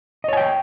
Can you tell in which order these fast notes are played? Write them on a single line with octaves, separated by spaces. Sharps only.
D#5 C#5 G#5 G5